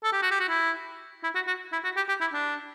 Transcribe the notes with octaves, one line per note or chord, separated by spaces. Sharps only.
A4
G4
F#4
G4
F#4
E4
E4
F#4
F#4
E4
F#4
G4
G4
E4
D4